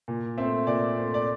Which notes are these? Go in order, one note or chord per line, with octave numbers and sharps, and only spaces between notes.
A#2
A3 C4 E5
A#2 D5
A3 C4
D5